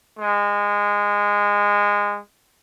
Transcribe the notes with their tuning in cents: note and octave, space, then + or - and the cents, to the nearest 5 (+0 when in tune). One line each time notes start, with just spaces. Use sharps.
G#3 -20